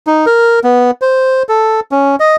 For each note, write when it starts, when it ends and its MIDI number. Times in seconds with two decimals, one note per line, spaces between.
0.07 0.26 63
0.26 0.59 70
0.64 0.91 59
1.02 1.43 72
1.49 1.80 69
1.92 2.16 61
2.20 2.36 75